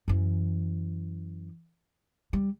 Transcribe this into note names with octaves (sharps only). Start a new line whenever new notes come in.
F#2 E3
G3